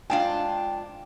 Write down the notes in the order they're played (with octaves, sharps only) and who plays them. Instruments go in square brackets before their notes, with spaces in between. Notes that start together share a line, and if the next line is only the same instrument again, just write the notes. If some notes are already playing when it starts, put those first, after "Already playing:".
[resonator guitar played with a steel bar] G#2 D4 F4 [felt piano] G5